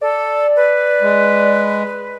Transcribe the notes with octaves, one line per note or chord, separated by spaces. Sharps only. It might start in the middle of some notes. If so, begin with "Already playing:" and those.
A4 D5
B4
G#3